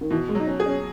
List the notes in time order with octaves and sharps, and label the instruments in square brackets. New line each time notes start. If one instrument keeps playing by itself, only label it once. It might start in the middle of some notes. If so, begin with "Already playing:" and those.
[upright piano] D#3
[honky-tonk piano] B2 [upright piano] E3
[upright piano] G#3
[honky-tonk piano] F#3 [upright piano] D#4
[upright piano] C#4
[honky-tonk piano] G#4
[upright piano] C#4